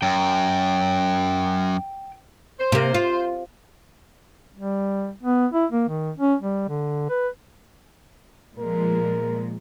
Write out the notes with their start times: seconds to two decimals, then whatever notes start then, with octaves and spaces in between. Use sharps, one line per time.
0.02 F#2 G5
2.59 C5
2.72 C3 A#3
2.94 F4
4.57 G3
5.23 B3
5.53 E4
5.72 A#3
5.88 D#3
6.18 C#4
6.41 G3
6.69 D3
7.09 B4
8.58 A#2 F3 G#3 A#4